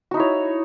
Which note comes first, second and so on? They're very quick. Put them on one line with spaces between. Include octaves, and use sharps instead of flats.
F#4 D#4 E4 C#5